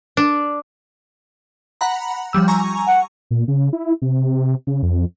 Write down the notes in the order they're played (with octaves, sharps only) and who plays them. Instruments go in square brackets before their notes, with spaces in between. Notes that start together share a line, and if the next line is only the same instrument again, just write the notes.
[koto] D4
[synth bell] F#5 A#5 B5
F3 G3 E6
G#5 A#5 C#6
[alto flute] F#5
[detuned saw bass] A#2
C#3
E4
C3
C#3
F2